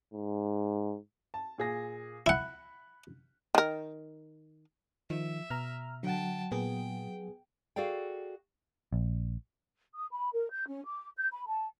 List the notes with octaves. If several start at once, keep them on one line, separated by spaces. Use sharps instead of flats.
G#2
A5
A#2 G#4 A#6
E4 F#5 B5 F#6
D#3 A#4
D#3 F3 E5
B2 A#5 F6
D3 F#3 F#5 G5 A5
A#2 B3 G#4 G5
F#4 G#4 A4 D5 F5 G5
A#1
D#6
B5
A#4
G6
C#4
D6
G6
B5
A5